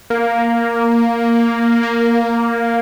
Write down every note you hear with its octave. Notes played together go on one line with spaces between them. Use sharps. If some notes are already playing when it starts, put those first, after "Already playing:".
A#3
A#3